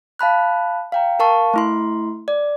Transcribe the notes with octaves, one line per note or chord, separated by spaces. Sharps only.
F5 A5 B5 F#6
F5 G5 A#5
A#4 F5 A5 C#6
A3 E4 C6
D5